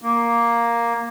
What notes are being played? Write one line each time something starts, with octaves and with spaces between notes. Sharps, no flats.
A#3